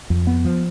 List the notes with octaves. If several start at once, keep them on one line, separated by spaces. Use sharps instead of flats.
F2
B3
F3